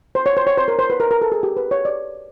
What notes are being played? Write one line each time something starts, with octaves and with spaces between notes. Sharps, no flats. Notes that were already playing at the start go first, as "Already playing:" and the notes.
C5
C#5
C5
C#5
C5
A#4
C5
B4
A#4
A#4
A4
G#4
G4
B4
C#5
D5